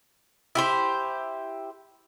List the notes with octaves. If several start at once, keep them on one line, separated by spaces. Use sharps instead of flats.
E4 G4 C5